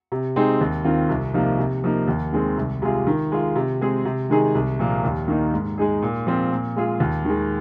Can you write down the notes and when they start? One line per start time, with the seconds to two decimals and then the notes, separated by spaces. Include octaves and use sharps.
0.12 C3
0.36 G#3 C4 D#4 G#4
0.61 D#2
0.84 D#3 C4 F4
1.09 C2
1.34 C3 F3 A#3 D#4
1.59 C3
1.84 F3 A#3 D#4
2.08 D#2
2.33 D#3 G#3 C4
2.57 C2
2.82 C3 G#3 F4 G#4
3.07 D#3
3.32 G#3 F4
3.56 C3
3.81 G#3 C4 G#4
4.05 C3
4.30 D#3 G#3 D#4 G#4
4.55 C2
4.79 A#2 F3 A#3
5.04 D#2
5.28 D#3 A#3 D#4
5.54 G#2
5.78 G#3 D#4 G#4
6.02 A#2
6.27 F3 C4
6.52 A#2
6.76 G#3 F4 G#4
7.00 D#2
7.25 D#3 G#3